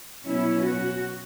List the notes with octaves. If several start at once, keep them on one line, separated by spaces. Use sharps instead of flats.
B2 F#3 C#4 E4
F#4